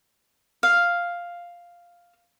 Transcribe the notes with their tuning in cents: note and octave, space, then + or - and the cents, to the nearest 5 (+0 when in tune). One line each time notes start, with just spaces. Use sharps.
F5 +0